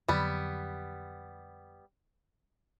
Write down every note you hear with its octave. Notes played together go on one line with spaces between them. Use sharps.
F2 D3 F#3 G3 B3